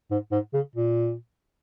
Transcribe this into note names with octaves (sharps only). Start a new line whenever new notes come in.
G#2
G#2
C#3
A#2